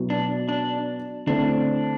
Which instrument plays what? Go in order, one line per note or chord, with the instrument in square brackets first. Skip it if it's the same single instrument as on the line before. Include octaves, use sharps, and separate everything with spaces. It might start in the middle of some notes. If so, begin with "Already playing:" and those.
Already playing: [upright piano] B2 F#3 B3 E4
[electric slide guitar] D4
D4
[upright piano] D3 A3 C4 E4 [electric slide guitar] D4